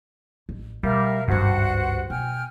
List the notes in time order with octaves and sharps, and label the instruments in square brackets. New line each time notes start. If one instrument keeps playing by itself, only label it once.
[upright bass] A1
[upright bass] B2 [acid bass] G3 [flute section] A#4 E5 F5
[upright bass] G#1 C#2 [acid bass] G2 [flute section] F#4 C5 F#5
[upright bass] B2 [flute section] G5 G#5 F6